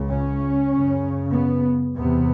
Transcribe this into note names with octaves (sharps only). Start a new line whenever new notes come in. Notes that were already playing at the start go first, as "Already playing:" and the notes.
Already playing: C#2 C#3
C#4
F#2 C#3
B3
E2 C3 B3